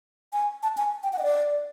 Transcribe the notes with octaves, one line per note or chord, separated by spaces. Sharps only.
G#5
A5
G#5
G5
F#5
D#5
D5